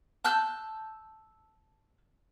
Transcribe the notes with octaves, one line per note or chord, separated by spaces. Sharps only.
A5 E6 F#6 G6